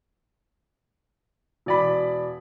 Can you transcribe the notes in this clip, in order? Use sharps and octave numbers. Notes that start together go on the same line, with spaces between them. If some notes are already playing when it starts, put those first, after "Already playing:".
E1 D5 B5